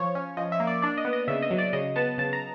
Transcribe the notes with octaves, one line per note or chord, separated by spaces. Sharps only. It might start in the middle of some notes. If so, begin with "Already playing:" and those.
Already playing: F3 C#5
C#4
F3 D#5
E5
A#3
D5
D4 D5
D#5
B3
D#5
C#3 E5
D#5
F#3
D5
C#3 D#5
B3 A5
C#3 A5
A#5